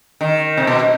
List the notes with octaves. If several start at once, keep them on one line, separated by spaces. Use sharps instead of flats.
D#3
C3
B2